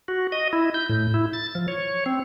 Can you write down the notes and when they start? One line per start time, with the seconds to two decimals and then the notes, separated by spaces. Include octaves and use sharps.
0.08 F#4
0.32 D#5
0.53 E4
0.74 G6
0.89 A2
1.14 E4
1.33 A6
1.55 F3
1.68 C#5
2.06 C4